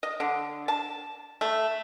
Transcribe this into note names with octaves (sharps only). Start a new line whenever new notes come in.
D#5
D3
A5
A3